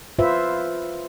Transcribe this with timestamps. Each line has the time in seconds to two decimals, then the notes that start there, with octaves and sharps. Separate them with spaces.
0.19 F4 B4 C5 E5